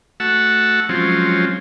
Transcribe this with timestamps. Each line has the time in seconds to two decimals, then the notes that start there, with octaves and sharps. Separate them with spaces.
0.20 A3 F#4 F#5 A5 E6
0.89 F3 F#3 G#3 C4 C#4 F4